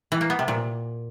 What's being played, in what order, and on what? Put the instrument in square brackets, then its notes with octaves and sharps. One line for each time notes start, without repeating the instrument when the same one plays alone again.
[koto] E3
A#3
B3
C3
A#2